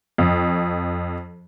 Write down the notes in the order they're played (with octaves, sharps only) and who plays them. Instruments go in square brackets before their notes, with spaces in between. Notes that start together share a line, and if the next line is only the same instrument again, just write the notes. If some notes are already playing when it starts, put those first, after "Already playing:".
[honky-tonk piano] F2